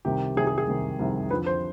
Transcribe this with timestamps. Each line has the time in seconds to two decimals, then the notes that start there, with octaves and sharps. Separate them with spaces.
0.05 C2 C3 D#3 G4
0.37 C2 C3 D#3 G#4
0.47 G#4
0.58 G#4
0.67 C2 C3 D#3
0.99 C2 C3 D#3
1.31 F2 D3 F3 B4
1.46 C5